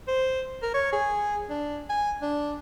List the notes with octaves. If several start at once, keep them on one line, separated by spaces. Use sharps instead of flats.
C5
A#4
C#5
G#4
D4
G#5
D4